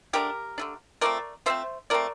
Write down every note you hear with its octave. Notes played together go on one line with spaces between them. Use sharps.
D3 A3 D4 G4 A#4
D3 A3 D4
F3 A3 C4 A#4 D5
F3 A3 C4 C5 E5
F3 A3 C4 A#4 D5